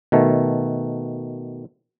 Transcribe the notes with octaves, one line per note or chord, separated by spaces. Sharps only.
B2 D#3 A3